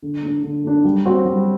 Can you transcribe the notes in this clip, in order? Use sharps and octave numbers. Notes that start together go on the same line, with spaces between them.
D3
A3 D4
D3
A3 D4
G3
C4 F#4
G3